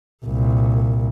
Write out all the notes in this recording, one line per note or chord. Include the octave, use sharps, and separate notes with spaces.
C2 A#2